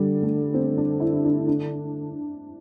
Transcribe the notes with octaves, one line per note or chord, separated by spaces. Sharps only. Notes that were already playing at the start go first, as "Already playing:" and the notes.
Already playing: D3 G3
A3
C4
D4
E4
D4
D4